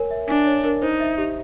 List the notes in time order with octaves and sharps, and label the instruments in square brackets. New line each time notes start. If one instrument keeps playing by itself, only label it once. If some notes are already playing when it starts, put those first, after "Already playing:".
Already playing: [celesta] A#4 C#5 G#5
E5
[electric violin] D4 [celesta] G#5
[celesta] C#5
A#4
[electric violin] D#4 [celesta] C5
[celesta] E5
G4